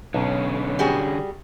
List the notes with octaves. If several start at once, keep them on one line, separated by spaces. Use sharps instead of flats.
B1 D3 C#4
G3 F#4 G#4